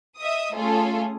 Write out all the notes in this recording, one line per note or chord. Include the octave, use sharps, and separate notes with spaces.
D#5 E5 D#6
A3 C#4 F4 G#4 A4